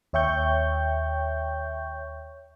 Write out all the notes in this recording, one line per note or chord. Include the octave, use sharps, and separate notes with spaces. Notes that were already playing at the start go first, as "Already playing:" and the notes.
D#2 C#5 E5 G5 C#6 G6